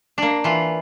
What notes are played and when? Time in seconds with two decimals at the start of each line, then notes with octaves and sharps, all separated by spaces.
0.18 A#3 D4
0.44 E3 F4